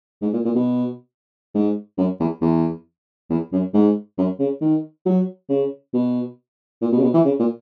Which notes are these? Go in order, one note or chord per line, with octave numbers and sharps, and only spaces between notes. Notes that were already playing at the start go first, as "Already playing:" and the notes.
G#2
A#2
A#2
B2
G#2
F#2
E2
E2
E2
F#2
G#2
F#2
C#3
D#3
F#3
C#3
B2
A#2
B2
C#3
B2
E3
C#3
A#2